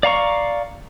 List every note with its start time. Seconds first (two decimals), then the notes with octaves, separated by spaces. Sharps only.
0.03 D5 F5 A#5 C#6